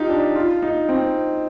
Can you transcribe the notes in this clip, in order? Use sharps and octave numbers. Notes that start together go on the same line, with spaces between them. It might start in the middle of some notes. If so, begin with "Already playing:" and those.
Already playing: D#4 F4 G4
D4
F4
D#4
C4